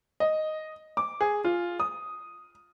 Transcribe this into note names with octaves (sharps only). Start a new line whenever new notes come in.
D#5
D6
G#4
F4
D#6